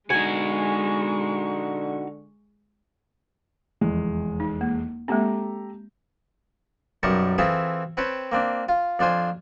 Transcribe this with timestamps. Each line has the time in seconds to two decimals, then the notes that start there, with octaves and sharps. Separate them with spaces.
0.10 D3 G#3 D#4 F#4 G#5 C#6
3.81 F1 E2 G#3
4.40 D#4
4.61 A#3
5.08 G#3 A#3 C4 G4 A4 A#5
7.03 B1 F#2 G3 A#4 A5 C#6
7.38 E3 C4 F4 G#4 A4 E5
7.97 C4 B4 C#5 G5 A5
8.32 A#3 C4 D4
8.68 F4 F5
8.99 F2 D4 F4 C5 G#5